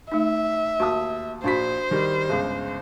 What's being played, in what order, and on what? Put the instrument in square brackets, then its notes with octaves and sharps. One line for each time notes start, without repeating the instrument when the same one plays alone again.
[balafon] A3 D#4 [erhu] E5
[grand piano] D#2 A5 D#6 [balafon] F#4
[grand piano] A#1 B6 [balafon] D4 F#4 B5 [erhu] C5
[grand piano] D#3 G3
[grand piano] G1 C#2 [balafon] G#4